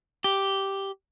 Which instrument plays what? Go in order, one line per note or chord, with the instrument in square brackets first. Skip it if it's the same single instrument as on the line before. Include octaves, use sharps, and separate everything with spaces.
[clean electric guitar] G4